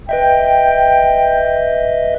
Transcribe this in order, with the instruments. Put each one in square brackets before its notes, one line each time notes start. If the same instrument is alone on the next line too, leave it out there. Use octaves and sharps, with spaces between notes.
[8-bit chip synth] B4 D#5 E5 [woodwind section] G5